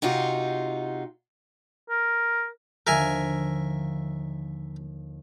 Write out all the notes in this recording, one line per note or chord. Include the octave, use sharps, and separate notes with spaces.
C3 D#4 F4 F#4
A#4
D#2 D3 F3 A#4 E5 G#5